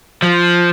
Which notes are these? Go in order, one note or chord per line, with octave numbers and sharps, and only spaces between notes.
F3